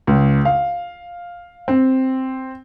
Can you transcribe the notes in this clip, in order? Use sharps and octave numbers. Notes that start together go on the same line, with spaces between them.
C#2
F5
C4